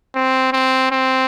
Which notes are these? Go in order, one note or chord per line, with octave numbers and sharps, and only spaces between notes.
C4
C4
C4